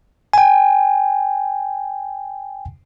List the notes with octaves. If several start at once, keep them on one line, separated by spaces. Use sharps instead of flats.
G5 G#5